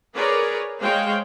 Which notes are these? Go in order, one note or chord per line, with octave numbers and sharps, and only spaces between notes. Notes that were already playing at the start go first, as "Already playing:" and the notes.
G#4 A#4 B4 C#5 D5
G#3 C5 C#5 F5 G5